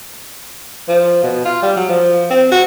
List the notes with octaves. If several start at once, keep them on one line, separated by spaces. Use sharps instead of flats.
F3
B2
F4
G3
F#3
F3
C4
F#4